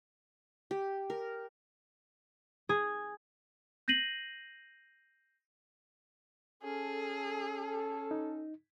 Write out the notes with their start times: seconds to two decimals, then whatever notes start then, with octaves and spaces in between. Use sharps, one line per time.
0.71 G4
1.10 A#4
2.69 G#4
3.88 G6 A#6 C7 D#7 F#7
6.63 C#4 G#4 A4
8.11 D#4